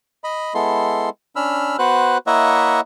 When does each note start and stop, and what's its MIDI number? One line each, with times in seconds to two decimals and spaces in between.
0.24 0.53 75
0.24 0.53 83
0.54 1.09 56
0.54 1.09 59
0.54 1.09 64
0.54 1.09 69
0.54 1.09 84
1.36 1.77 61
1.36 1.77 62
1.36 1.77 83
1.36 1.77 88
1.36 1.77 89
1.79 2.18 59
1.79 2.18 66
1.79 2.18 71
1.79 2.18 72
1.79 2.18 90
2.27 2.80 58
2.27 2.80 64
2.27 2.80 73
2.27 2.80 75
2.27 2.80 76
2.27 2.80 78